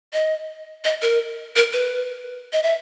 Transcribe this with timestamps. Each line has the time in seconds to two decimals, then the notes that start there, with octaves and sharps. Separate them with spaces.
0.13 D#5
0.85 D#5
1.02 A#4
1.56 A#4
1.73 B4
2.53 D#5
2.63 E5